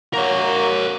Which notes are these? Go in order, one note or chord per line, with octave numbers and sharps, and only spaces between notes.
A#3 F#4 A#4 C#5